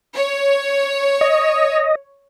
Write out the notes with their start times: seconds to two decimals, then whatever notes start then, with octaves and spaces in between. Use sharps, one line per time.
0.16 C#5
1.21 D#5